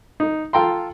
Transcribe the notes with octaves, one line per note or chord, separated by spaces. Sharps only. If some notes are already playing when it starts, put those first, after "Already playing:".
D#4
F4 A4 G5 A#5 C6